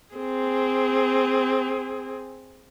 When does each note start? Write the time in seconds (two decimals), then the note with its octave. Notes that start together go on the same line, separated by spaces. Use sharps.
0.15 C4 G#4